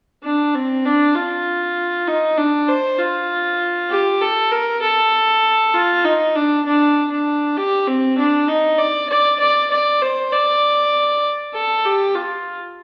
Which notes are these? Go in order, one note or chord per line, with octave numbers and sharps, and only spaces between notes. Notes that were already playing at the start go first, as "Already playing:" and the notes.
D4
C4
D4
F4
D#4
D4
C5
F4
G4
A4
A#4
A4
F4
D#4
D4
D4
D4
G4
C4
D4
D#4
D5
D5
D5
D5
C5
D5
A4
G4
F4